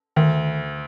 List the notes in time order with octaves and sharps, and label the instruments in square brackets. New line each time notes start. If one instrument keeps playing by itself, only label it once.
[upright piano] D2 [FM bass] D#3